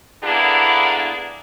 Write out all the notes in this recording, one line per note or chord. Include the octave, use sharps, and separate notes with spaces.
D3 A#3 B3 D4 E4 G#4